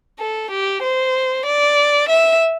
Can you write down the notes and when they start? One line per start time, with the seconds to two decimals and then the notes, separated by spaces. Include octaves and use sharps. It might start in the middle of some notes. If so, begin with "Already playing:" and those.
0.19 A4
0.51 G4
0.83 C5
1.46 D5
2.09 E5